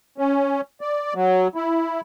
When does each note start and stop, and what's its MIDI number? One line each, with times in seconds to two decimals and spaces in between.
0.18 0.61 61
0.81 1.14 74
1.15 1.48 54
1.55 2.01 64